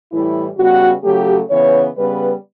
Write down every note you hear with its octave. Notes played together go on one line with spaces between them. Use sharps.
A2 E3 G3 E4
C#3 G3 B3 F#4
C#3 F#3 A3 G4
C#3 E3 B3 C#5
C#3 G3 B3 B4